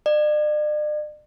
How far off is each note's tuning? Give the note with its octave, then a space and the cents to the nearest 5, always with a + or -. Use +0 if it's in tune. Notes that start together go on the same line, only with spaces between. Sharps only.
D5 +45